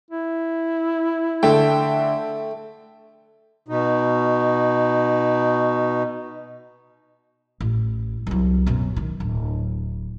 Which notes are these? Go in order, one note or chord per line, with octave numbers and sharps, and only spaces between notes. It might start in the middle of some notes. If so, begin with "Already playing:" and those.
E4
D3 A3 E5 G5
B2 D#4
A1
C2 F#3
F#2 B2
D#3
D1